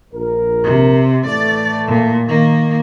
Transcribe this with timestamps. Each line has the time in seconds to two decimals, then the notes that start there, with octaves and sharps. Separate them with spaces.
0.14 A#1 A#4
0.64 C3
1.26 A2 E3 A3 D5
1.87 A#2
2.26 D#3 A#3